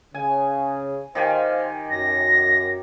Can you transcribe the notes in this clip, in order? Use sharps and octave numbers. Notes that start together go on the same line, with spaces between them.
C#3 G#5
D#3 G4 C5 F5 G#5
F#2 A#6